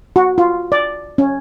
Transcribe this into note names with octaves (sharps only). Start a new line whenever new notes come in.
F#4
F4
D5
C#4